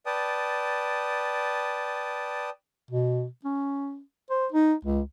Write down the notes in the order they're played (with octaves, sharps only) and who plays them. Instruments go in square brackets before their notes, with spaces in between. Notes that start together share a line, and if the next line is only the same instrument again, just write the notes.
[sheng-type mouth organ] B4 D5 G5 A5 D#6
[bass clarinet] B2
C#4
C5
D#4
C#2